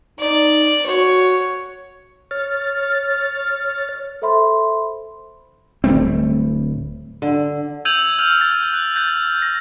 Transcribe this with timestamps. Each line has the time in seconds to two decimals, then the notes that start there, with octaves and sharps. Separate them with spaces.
0.20 D#4 D5
0.86 F#4 C#5
2.31 C#5 F6 A6
4.22 A4 C5 E5 B5 C6
5.84 D1 G3 A3 C4
7.22 D3
7.85 E6 G6 G#6 D#7 F7 F#7
8.19 E6 F6 F7
8.41 A6
8.74 F#6
8.96 G6 A6
9.42 A#6